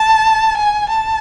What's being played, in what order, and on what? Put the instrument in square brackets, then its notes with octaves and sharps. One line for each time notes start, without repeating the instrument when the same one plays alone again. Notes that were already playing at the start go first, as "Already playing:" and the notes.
Already playing: [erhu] A5
G#5
A5